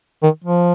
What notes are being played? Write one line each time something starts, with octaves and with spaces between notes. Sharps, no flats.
D#3
F3